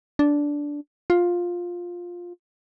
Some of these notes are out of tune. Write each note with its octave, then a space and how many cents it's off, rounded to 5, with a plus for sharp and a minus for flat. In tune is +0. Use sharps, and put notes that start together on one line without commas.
D4 -10
F4 +10